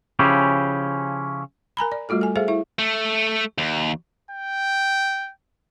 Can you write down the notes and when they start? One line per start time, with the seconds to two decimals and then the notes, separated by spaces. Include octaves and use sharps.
0.19 C#3 F3 C#4 E4 G4
1.77 A#4 G#5 A#5 B5
1.92 D5
2.09 G3 A3 F4 F#4 A4
2.21 A4 G#5
2.36 G#4 A4 C5 E5 F5
2.48 E4 E5
2.79 A3
3.58 D#2
4.31 G5